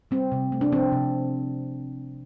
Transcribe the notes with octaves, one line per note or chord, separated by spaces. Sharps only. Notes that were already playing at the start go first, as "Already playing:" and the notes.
G3 C4
C3
A3
D4
F3 C4
C3